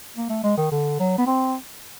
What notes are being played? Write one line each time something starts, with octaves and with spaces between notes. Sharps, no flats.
A#3
A3
G#3
D#3
D3
F#3
B3
C4